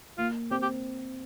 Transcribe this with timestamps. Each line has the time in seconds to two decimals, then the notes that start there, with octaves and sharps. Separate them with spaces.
0.18 A#3 F4
0.51 C4 G4
0.62 G4